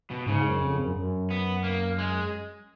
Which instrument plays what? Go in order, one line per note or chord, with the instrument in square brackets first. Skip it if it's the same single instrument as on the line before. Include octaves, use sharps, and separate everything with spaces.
[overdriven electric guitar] B2
[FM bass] G#2 [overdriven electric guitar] C#3
[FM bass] F#2
F2
F#2
F#2
[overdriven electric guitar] B3
A#3
G#3